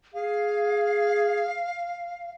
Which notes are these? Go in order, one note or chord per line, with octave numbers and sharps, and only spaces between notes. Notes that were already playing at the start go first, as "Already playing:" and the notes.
G#4 F5